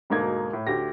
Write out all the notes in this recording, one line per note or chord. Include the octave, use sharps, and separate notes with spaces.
D2 G#2 B2 A#3 D#4 G#6
A2
D2 G4 A#6